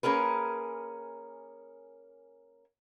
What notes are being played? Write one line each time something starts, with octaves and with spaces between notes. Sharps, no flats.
A#3 C#4 G#4 A#4 B4